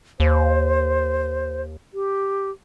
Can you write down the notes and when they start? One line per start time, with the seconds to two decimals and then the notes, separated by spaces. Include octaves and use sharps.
0.20 D#2 C5
1.94 G4